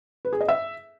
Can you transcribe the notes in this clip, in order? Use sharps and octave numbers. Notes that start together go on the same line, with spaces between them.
B4
G#4
D#5
E5